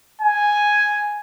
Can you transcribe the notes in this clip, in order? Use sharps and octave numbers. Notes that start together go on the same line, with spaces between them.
G#5